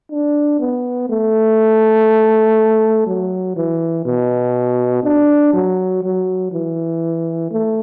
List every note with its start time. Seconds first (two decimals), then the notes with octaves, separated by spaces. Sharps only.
0.11 D4
0.59 B3
1.09 A3
3.07 F#3
3.56 E3
4.05 B2
5.04 D4
5.53 F#3
6.03 F#3
6.52 E3
7.51 A3